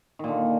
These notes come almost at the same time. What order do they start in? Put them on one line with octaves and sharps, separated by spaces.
D#3 A#2 D3